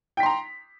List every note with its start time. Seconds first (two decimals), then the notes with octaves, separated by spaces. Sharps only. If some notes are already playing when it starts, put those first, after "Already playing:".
0.17 G5
0.20 B6
0.23 C6
0.26 A#5